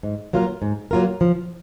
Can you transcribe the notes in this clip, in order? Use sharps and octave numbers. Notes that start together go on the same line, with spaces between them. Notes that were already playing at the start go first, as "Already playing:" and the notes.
G#2
F#3 A#3 F4 A#4
G#2
F#3 A#3 F4 A#4
F3